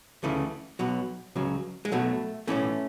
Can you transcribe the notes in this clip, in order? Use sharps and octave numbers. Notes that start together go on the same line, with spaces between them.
D2 C#3 E3 A3
B1 B2 F#3
C#2 C#3 F#3
G#3
B1 B2 F#3 A3
B1 A2 E3 A3 C#4